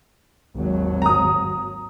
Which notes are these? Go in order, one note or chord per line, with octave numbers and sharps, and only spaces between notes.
G#1 D#2 F#3
A#5 D#6